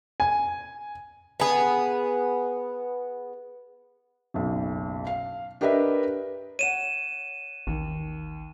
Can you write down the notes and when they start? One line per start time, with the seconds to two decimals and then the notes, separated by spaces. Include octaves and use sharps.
0.20 G#5
1.40 B3 G#4
4.34 F#1 B1
5.07 F5
5.61 D4 G4 A#4 B4 D#5 E5
6.59 C#5 F#5 D#7 E7
7.67 A1 D#2